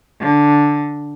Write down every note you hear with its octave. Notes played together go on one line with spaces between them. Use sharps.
D3